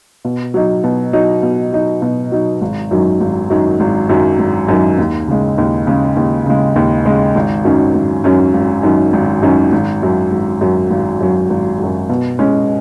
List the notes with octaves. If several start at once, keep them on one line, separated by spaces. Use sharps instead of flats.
B2
F#3 D#4
B2
F#3 D#4
B2
F#3 D#4
B2
F#3 D#4
G#1
F#2 D#3 F#3
G#1
F#2 D#3 F#3
G#1
F#2 D#3 F#3
G#1
F#2 D#3 F#3
D#2
C#3 G#3
D#2
C#3 G#3
D#2
C#3 G#3
D#2
C#3 G#3
G#1
F#2 D#3 F#3 C#4
G#1
F#2 D#3 F#3 C#4
G#1
F#2 D#3 F#3 C#4
G#1
F#2 D#3 F#3 C#4
G#1
F#2 F#3
G#1
F#2 F#3
G#1
F#2 F#3
G#1
F#2 F#3
B2
G#3 C#4